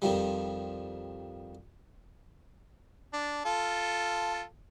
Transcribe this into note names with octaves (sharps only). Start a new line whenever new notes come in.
F2 D#3 F3 G3
D4
F4 A4